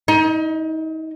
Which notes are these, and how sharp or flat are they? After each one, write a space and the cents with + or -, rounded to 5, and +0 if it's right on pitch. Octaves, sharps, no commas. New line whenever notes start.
D#4 +35